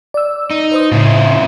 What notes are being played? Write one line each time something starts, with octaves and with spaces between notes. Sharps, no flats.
D5 E6
D#4
B4 C5 D#6
A2 C#3 C#4 E4 F4